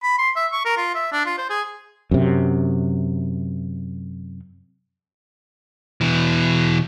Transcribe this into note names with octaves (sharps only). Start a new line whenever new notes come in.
B5
C6
E5
C#6
A#4
F4
E5
D4
F4
C5
G#4
F#2 C3
B2 E3